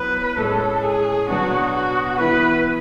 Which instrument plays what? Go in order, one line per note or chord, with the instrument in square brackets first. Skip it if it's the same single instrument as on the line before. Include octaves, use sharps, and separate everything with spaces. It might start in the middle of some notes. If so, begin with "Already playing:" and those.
Already playing: [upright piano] F#3 B3 E4 [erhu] B4
[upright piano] A2 G#3 C#4 [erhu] A4
[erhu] G#4
[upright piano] B2 F#3 B3 D4 [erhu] F#4
[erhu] F#4
[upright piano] E3 B3 E4 [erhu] B4